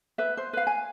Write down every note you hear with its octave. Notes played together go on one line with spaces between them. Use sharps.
B4 E5
C5
B4 F5
G#5